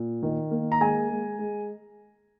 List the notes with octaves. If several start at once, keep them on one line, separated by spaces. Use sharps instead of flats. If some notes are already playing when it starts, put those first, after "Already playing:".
Already playing: A#2
D#3
A#3
A#5
G#3 G#5
G#3
G#3